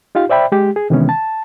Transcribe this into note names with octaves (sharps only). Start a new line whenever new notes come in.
D#4 F4 G4 F5
C5 D5 E5 G5 B5
G#3 G4
G#4
C3 D#3 E3 G#3 B3 C#4
A5